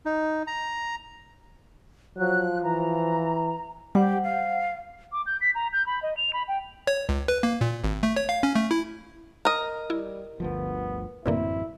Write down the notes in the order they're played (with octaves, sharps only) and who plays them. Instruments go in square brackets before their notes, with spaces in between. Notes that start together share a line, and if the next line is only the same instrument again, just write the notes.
[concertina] D#4
A#5
[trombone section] F3 [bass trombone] F#3 [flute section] F#6
[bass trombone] E3 [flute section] A#5
[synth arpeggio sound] G3 [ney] G4 [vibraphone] C5 F#5
[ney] F5
[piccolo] D6
G6
B6
A#5
G6
B5
D#5
F7
B5
G5
[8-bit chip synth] C#5
C#2
B4
A#3
A#2
G#1
A3
C#5
F5
C#4
A3
E4
[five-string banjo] A#4 D#5
[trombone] G3 [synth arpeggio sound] E4
[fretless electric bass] G1 D2 F3 [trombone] B3
[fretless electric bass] A1 F#2 C4 [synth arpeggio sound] B2 D3 A#3 [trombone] E4